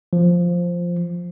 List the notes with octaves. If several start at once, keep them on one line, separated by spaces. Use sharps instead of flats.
F3